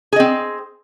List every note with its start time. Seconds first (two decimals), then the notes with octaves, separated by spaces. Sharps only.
0.12 G#4
0.16 D#5
0.20 C4